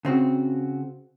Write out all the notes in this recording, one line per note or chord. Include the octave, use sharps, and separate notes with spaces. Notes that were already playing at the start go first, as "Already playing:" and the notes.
C#3 C4 F#4